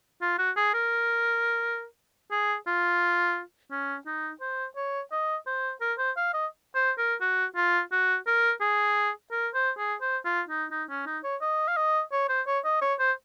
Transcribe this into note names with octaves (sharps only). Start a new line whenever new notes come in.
F4
F#4
G#4
A#4
G#4
F4
C#4
D#4
C5
C#5
D#5
C5
A#4
C5
F5
D#5
C5
A#4
F#4
F4
F#4
A#4
G#4
A#4
C5
G#4
C5
F4
D#4
D#4
C#4
D#4
C#5
D#5
F5
D#5
C#5
C5
C#5
D#5
C#5
C5